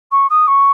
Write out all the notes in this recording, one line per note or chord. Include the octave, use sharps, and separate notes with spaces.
C#6
D#6
C#6